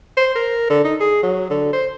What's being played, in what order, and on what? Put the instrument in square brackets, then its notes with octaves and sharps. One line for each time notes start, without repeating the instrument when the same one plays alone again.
[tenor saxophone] C5
A#4
D3
D#4
G#4
F#3
D3
C5